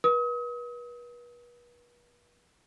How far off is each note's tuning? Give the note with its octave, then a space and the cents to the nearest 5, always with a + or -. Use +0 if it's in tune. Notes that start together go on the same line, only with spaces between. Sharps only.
B4 -40 D#6 +40